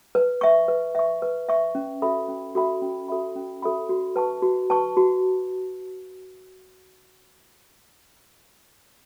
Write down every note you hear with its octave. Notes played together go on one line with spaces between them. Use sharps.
B4
E5 C#6
B4
E5 C#6
B4
E5 C#6
C#4
F#4 A4 E5 B5
C#4
F#4 A4 E5 B5
C#4
F#4 A4 E5 B5
C#4
F#4 A4 E5 B5
F#4
B4 A5 C#6
F#4
B4 A5 C#6
F#4